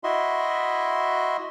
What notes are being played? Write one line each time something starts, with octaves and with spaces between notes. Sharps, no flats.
E4 F#4 D#5 E5 C6